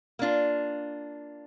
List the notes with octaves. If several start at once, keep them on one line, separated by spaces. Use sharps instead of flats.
A#3 D4 F4